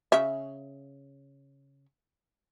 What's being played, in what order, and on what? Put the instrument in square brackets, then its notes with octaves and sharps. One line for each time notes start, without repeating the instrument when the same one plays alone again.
[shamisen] C#3 E5